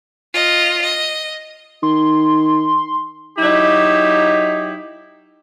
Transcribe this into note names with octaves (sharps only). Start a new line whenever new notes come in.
F4 D#5
D#5
D#3 C6
F#3 D#4 E4 G4